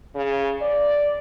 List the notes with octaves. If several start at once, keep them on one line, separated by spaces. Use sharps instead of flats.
C#3
D5